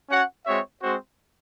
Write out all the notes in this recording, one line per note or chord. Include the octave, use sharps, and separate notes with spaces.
C#4 F#4 C#5 F#5
G#3 C4 F#4 C#5 E5
G#3 C4 F#4 C5